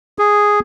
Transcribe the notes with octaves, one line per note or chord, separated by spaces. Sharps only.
G#4